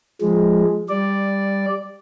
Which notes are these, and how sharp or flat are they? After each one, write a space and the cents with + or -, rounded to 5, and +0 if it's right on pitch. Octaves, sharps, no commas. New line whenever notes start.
F3 +5 G#3 +0
G3 +10 D5 +0